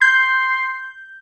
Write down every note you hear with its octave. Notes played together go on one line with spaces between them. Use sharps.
C6 G6